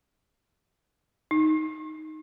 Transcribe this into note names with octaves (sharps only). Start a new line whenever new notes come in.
D#4